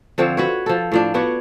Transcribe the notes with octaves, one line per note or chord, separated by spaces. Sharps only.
D3 F3 C4 C#5
F#4 B4 C#5
F3 A4
A2 F3 D4
B3 D4 F#4 C#5